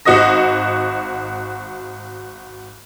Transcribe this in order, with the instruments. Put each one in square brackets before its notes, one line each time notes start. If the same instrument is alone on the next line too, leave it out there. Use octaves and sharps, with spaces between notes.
[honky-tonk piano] G#1 F#4 D#5 D#6 A#6